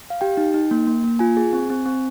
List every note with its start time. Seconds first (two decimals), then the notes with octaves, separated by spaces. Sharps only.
0.10 F5
0.21 G4 G5
0.37 D#4
0.54 D#4
0.71 A#3
0.87 A#3
1.04 A#3
1.19 F4 G#5
1.37 G#4
1.53 C4
1.70 C4
1.86 C4